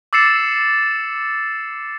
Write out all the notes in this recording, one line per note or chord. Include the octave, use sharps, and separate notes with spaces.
D6 E6 A6 C7 C#7 E7